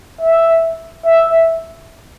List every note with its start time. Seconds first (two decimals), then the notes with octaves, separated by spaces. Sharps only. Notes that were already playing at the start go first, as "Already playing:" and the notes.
0.21 E5
1.05 E5